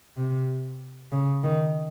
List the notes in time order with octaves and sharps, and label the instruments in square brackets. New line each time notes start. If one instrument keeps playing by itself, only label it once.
[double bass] C3
C#3
D#3